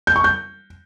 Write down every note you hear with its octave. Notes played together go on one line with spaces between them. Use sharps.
G6
C#6
G6